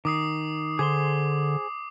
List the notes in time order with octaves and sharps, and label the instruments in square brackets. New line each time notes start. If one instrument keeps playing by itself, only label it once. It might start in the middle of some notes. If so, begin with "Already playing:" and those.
[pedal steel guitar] D#3 [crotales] D6 D#6 C7
[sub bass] D3 [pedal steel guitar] G#4 C5 C6 [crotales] D6